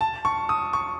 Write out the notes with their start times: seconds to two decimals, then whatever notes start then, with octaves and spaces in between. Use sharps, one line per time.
0.01 A5
0.25 C#6
0.49 D#6
0.73 C#6